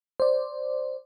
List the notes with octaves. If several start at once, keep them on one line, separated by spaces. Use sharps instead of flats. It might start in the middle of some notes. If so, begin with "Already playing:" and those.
C5 D5